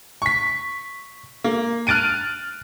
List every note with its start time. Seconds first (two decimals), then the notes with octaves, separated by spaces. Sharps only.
0.22 C#6 B6
1.44 A#3
1.87 F6 F#6 A6 D7 D#7